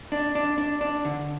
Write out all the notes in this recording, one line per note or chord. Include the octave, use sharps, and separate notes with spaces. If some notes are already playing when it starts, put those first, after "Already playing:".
D4
D4
D4
D4
D3